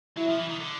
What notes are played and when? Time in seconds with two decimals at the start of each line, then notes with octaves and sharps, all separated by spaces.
0.17 F#3 E4
0.29 F3
0.39 E3
0.49 D#3
0.60 D3